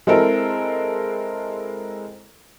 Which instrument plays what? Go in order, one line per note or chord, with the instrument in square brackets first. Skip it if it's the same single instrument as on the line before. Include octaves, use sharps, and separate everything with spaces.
[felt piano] G#3 C4 E4 A4 A#4